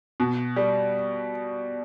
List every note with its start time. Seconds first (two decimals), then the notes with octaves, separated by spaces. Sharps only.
0.20 B2
0.56 G3